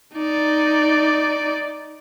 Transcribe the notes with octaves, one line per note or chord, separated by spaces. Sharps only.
D#4 D5